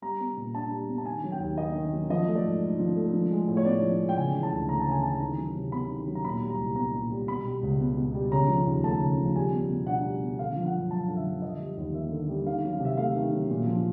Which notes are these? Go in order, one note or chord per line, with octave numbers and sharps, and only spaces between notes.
G3 A#5
B3
A#2
D4 A5
G3
B3
A5
D#3 G#5
F#3
G5
D#2
A#3 D#5
D#3
F#3
F3 D#5
A3
D5
G#2
G#2
F3
A3
F3
G#3
A2
C#5
B3 D5
F3
G#3
G5
C#3 G#5
E3
A5
D2
A3 A#5
A5
C#3
G#5
E3 A5
D#3 A#5
F#3
C3
B3 B5
D#3
F#3
A#5
A#2 B5
G3
A#5
C2
B3 A#5
A#2
G3
B2 B5
G3
C#2
B3
B2
G3
C#3 A#5
F3
D#2
A3 A5
C#3
F3
G3 G#5
B3
B2
D4 F#5
G3
B3
D3 F5
F3
F#5
F#2
F#2 A5
D3
E5
F3
D3 D#5
G3
D#2
A#3 E5
D3
G3
D#3 F5
F#3
F5
C3 E5
A3 F5
D#3
F#3
A#2
F3